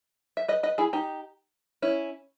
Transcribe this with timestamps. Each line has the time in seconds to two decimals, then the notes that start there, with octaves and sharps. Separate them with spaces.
0.37 E5
0.48 B4 D#5
0.63 B4 D#5
0.78 E4 G#4
0.93 D#4 G4
1.82 C#4 E4